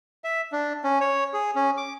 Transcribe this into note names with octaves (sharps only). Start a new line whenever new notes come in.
E5
D4
C#4
C#5
G#4
C#4
D6